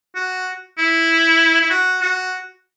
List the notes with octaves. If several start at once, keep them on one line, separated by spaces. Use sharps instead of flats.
F#4
E4
E4
F#4
F#4